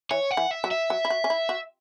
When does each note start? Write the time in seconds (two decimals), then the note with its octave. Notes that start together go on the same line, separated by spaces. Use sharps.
0.11 E3 C#5
0.31 F#5
0.37 E3
0.51 E5
0.64 F#3
0.71 E5
0.90 F#3
1.05 E4
1.10 F#4
1.24 C#4
1.30 E4
1.49 F#4